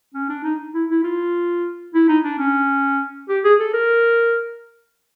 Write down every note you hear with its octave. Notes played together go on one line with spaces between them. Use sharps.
C#4
D4
D#4
E4
E4
F4
E4
D#4
D4
C#4
G4
G#4
A4
A#4